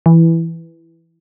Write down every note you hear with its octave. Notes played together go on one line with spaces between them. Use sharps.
E3